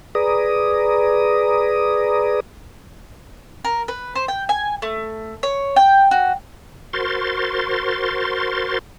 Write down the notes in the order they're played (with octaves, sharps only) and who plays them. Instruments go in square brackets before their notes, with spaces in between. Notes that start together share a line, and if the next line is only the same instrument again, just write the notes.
[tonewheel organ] G#4 B4 D5 A#5 D#6
[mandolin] A#4
B4
C5
G5
G#5
A3
C#5
G5
F#4
[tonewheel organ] F#4 A#4 C5 C6 A6